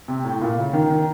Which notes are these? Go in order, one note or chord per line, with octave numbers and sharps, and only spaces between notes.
C3
A2
A#2
C#3
D#3
D#3